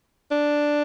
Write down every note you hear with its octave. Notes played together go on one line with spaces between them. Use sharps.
D4